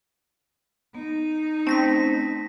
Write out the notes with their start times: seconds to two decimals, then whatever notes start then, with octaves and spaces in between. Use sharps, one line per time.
0.95 B3 D#4
1.67 A3 C4 C#4 A5 A#6 B6